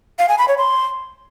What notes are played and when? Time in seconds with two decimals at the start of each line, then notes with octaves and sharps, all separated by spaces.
0.19 F5
0.29 G#5
0.38 B5
0.48 C#5
0.58 C6